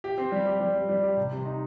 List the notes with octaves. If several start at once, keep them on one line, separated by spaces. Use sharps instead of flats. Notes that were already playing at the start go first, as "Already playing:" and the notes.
G4
C4
G3
G4
G3
G3
G3
G4
C3
C3
D#4